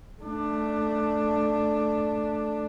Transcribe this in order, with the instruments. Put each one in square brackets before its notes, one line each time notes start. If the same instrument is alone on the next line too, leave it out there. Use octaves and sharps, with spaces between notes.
[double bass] A3 D4